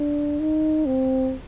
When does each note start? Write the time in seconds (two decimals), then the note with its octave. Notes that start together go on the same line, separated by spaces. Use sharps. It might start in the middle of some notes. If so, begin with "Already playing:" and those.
Already playing: D4
0.40 D#4
0.86 C4